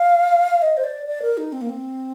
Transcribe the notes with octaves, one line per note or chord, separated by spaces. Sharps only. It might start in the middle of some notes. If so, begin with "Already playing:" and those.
Already playing: F5
D#5
C5
D5
D5
A#4
D#4
C4
A#3
C4